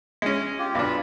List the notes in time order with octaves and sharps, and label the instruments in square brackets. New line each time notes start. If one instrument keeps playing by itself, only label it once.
[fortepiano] G#3 C#4
[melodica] F4 G4
[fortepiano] B1 D4 [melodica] F4 B5